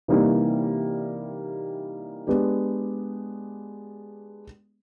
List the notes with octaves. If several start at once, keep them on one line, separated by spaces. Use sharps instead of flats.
C3 E3 G3 A#3 D#4
G#3 B3 D4 G4